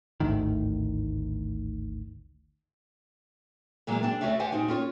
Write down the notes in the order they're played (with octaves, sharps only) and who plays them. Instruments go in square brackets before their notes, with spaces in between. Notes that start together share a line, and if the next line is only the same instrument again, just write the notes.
[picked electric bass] G#1 D2 A2 D#3
[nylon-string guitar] A#2 E3 F#3 G#3 A#3
C4 D4 A5
D2 A3 F#4 C#5 E5 F5
G4 C5 F5 F#5 G#5
A#2 C4 D#4 F#4
C#4 F4 C5 C#5